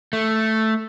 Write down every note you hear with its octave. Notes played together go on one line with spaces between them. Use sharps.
A3